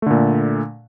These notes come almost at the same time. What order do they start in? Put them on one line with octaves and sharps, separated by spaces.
A3 D3 A#2